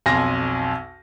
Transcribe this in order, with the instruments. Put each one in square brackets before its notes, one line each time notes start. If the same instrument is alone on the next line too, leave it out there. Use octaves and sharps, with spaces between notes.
[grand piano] B1 F2 G#5 C6 A#6